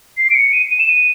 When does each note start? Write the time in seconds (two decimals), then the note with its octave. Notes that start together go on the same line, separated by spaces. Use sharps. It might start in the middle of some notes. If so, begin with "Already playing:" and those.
0.17 C7
0.30 D7
0.35 C#7
0.53 D#7
0.71 D#7
0.80 E7
0.89 D#7